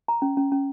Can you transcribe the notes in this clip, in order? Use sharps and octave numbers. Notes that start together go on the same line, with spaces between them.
A#5
C#4
C#4
C#4